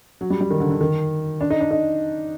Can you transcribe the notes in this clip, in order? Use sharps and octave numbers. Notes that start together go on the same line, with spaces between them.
F#3
G3
G3
D#3
D3
D3
D#3
D4
D#4
D4
D#4